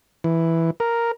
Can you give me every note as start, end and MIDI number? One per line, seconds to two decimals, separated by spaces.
0.24 0.71 52
0.80 1.11 70